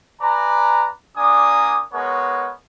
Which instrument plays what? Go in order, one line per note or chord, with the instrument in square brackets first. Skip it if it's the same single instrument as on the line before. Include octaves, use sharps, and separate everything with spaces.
[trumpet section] B4 D5 G#5 A#5
A#3 D4 D5 G#5 D#6
G#3 B3 A#4 C#5